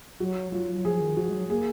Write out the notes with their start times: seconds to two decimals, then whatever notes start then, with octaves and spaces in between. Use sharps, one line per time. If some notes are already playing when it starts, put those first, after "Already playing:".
0.20 F#3 F#4
0.52 F#3 F4
0.75 F#3
0.85 F3 G#4
1.00 D#3
1.17 F3 F#4
1.29 G#3
1.33 F#3
1.50 A#3 G#4